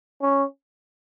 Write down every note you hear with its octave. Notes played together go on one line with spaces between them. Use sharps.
C#4